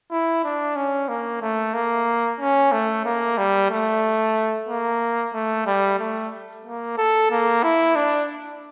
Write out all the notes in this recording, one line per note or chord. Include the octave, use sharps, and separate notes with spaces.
E4
D4
C#4
A#3
A3
A#3
C#4
A3
A#3
G3
A3
A#3
A3
G3
A3
A#3
A4
A#3
E4
D4